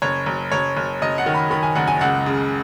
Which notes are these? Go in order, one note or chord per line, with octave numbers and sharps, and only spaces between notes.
F#1 C#5
F#1
F#1 C#5
F#1
F#1 D#5
F#5
D#3
B5
D#3 B5
G#5
F#1 F#5
G#5
C#2 F#5
C#3